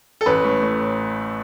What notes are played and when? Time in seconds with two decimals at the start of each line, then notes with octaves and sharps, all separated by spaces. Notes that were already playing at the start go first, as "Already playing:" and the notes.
0.21 A4
0.26 A1 B4
0.44 A2
0.62 A2